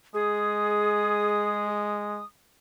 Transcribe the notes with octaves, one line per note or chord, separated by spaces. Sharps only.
G#3 G#4 D#6